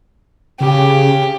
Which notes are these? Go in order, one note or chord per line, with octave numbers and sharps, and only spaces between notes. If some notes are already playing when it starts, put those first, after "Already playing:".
C#3 G4